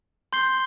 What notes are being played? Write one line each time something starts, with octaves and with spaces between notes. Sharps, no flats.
C6 G6 C7 G7